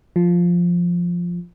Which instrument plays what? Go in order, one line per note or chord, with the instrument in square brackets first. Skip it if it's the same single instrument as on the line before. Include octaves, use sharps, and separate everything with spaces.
[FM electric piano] F3